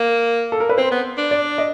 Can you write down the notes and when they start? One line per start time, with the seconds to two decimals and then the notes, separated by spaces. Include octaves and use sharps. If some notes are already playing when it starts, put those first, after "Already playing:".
Already playing: A#3
0.52 A4
0.60 A#4
0.69 B4
0.78 C4 C5
0.91 B3
1.18 D4
1.31 D5
1.58 D#5